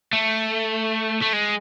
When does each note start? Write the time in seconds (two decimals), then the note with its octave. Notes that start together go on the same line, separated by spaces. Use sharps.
0.13 A3
1.22 A3
1.33 G#3